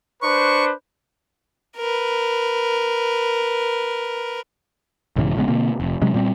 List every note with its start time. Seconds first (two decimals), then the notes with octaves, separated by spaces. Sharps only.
0.22 D4 B4 C5 C#6
1.77 A#4 B4
5.16 B1 G#2 C#3 E3
5.36 A#1 C#3 G#3 B3
5.48 B2 D3 A#3 C4
5.80 F1
6.02 C3 F#3 G#3 C#4
6.14 A#2 G3 C4